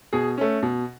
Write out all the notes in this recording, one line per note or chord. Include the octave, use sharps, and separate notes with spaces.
B2 G#4
A3 C#4
B2